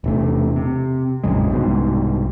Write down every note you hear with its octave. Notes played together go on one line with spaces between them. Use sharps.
E1 C3 A3
C3
A#1 F2 C#3 G#3
C2 G#2 B2